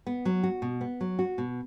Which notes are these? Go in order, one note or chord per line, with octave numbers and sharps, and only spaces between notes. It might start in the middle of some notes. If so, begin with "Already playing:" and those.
B3
F#3
F#4
B2
B3
F#3
F#4
B2